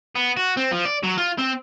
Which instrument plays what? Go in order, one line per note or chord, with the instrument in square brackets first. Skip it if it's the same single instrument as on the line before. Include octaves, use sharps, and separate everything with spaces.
[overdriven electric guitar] B3
F#4
C4
F3
D5
F#3
F4
C4